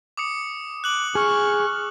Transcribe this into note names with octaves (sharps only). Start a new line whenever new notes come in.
D6 D#6 C#7
D6 F#6 F#7
G#4 C#6 F6